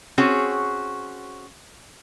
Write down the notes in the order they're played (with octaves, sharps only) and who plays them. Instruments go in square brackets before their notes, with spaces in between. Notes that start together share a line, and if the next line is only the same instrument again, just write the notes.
[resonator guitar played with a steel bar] C4 C#4 F#4 G#4 C#5